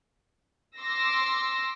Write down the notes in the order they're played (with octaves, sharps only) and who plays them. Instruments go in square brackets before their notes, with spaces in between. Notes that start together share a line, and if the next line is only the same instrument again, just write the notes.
[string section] C6 D6 E6 A#6